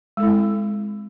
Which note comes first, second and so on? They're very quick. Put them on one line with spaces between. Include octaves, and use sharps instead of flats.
G#3 A4 E4 C4